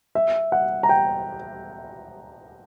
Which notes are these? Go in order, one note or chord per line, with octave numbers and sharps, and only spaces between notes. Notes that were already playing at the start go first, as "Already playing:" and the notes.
E5
F#5
A#5
G5